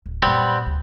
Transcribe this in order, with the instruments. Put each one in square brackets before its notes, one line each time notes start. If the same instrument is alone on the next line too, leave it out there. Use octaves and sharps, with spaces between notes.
[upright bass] D1
[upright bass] F#2 A#2 [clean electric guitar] G3 B3 C4
[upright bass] D2